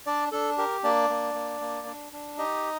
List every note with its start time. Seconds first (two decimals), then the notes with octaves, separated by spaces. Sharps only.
0.06 D4 D5
0.32 D4 A4
0.58 G4 A#4
0.83 A#3 D4 D5
1.10 A#3
1.35 A#3
1.61 A#3
1.87 D4
2.12 D4
2.38 D#4 G4 D#5